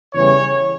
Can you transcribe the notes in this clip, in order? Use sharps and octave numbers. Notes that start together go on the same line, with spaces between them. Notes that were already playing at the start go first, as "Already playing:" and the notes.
E2 C#3 E3 G3 C#5